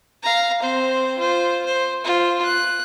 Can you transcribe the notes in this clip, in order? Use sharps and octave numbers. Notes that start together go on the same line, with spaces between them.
F5 A#5
C4 C5
F4 C5
C5
F4 C5
F#6